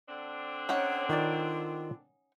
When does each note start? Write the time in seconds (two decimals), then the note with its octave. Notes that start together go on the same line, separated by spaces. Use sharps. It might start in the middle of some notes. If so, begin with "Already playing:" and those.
0.08 D3 C4 D4
0.69 C#4 D#4 C#5 F#5
1.09 D#3 F4 D5